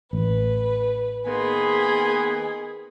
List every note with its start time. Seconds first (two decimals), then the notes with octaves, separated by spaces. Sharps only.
0.13 A1 B4
1.27 D#3 A#3 B3 G#4 B5 C6